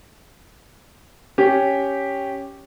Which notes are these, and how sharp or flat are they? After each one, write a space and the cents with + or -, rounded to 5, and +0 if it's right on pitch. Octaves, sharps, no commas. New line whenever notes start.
C#4 +0 G4 +0